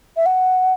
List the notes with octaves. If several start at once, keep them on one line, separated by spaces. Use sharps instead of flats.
E5
F#5